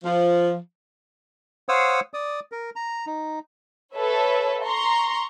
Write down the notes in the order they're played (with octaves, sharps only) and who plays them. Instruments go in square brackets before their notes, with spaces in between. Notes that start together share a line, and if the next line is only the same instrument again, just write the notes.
[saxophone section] F3
[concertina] C5 C#5 F5 F#5 D#6 E6
D5 D#6
A#4
A#5
D#4
[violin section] A4 B4 C#5 E5
A#5 C6 C#6